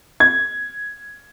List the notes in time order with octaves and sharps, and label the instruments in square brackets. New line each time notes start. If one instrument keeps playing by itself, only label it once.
[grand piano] G#6